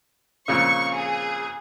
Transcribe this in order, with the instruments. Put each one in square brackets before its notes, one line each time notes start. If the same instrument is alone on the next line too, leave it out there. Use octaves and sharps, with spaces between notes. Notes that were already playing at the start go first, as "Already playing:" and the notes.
[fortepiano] F2 A#2 C#3 [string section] C#6
[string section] G#4